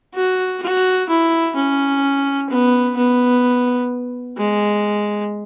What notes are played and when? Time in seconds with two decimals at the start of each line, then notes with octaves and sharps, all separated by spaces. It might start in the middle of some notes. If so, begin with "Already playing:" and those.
0.15 F#4
0.62 F#4
1.09 E4
1.55 C#4
2.50 B3
2.96 B3
4.37 G#3